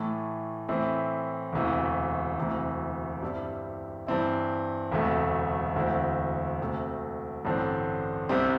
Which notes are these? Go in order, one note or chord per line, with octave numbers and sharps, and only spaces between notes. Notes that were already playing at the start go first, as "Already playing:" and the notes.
Already playing: A2 E3 A3
A2 E3 C4 E4
E1 D2 C3 E3
E1 D2 C3 E3
G2 G3 C4 E4
G2 E3 C4 E4
E1 D2 C3 A3
E1 D2 D3 C4 E4
D2 C3 A3
A1 G2 D3 C4
C2 C3 G3 C4